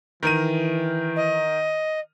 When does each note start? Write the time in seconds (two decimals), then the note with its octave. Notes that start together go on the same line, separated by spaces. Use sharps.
0.23 D#3 E3 A#4 D#7
1.16 D#5